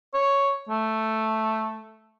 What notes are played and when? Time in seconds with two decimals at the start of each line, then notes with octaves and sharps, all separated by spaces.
0.14 C#5
0.69 A3